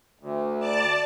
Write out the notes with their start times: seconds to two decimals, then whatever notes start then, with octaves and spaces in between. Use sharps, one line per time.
0.20 D2
0.59 D5 A5